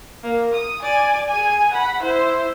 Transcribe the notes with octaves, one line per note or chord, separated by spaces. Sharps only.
A#3
D#6
D5 G#5
G#4 G#5
F#5 B5
E4 C5